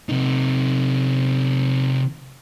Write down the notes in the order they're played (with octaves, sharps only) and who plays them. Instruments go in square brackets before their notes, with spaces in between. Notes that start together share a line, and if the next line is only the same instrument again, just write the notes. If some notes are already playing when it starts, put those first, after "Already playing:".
[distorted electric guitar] C3 D#4